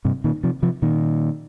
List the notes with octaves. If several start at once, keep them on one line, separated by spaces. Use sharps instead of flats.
G2 C3
A#2 D#3
C3 F3
C3 F3
A#2 D#3